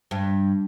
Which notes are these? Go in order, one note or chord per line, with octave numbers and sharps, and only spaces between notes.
G2